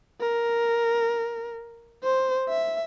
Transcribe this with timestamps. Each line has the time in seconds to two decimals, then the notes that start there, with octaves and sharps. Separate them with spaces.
0.21 A#4
2.04 C5
2.49 E5